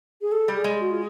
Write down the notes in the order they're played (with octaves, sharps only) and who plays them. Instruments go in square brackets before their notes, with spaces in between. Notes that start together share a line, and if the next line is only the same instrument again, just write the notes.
[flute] G#4
A4
[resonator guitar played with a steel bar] G3
[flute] G#4
[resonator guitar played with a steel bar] G#3
[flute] F#4
F4